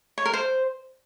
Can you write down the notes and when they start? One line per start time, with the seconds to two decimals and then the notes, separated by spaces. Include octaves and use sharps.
0.18 C#5
0.26 A#4
0.33 C5